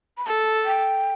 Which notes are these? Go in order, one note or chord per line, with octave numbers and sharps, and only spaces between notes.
B5
A4 A5
G5